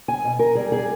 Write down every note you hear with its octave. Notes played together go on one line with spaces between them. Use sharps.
G#5
B2
A#4
G3 G#4
G#4